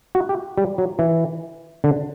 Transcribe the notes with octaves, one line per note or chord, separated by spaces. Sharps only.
F#4
G4
G3
F#3
E3
D3